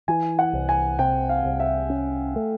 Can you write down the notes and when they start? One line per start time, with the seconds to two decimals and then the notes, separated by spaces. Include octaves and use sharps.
0.08 E3 G#5
0.39 F#5
0.53 C2
0.69 G#5
0.99 C3 G5
1.29 F5
1.45 C2
1.60 E5
1.90 C#4
2.36 A3